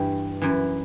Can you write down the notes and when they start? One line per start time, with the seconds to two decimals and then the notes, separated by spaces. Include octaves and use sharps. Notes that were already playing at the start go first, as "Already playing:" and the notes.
Already playing: G2 E3 G4
0.42 F#2 E3